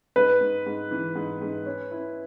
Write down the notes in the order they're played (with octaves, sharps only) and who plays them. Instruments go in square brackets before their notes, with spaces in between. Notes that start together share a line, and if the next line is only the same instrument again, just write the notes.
[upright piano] G#2 [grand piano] B4
[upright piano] G#2
G#2
E3
G#2
G#2
C#4
E4